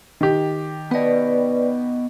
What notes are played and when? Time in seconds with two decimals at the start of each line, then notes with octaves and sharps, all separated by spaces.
0.21 D#3 G4
0.91 B3 B4 D5 D#5